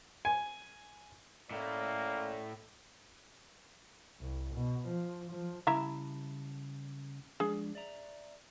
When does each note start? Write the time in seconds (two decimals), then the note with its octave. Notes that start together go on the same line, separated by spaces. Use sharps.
0.25 G#5
1.51 A2 A3 A#3 C#4 D5
4.20 C2
4.53 B2
4.87 F3
5.31 F3
5.67 C#3 G3 E4 E5 A5 A#5
7.40 F3 G#3 D4 G#4
7.75 D5 E5 A#5